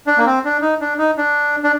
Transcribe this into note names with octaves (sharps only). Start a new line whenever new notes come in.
D4
A#3
C4
D4
D#4
D4
D#4
D4
D4